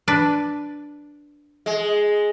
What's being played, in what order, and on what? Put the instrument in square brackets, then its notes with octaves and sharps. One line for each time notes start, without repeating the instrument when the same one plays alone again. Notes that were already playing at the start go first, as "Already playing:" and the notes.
[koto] D4 B4
[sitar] G#3